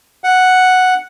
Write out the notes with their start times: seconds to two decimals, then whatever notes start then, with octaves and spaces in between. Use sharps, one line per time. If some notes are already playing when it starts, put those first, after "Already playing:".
0.24 F#5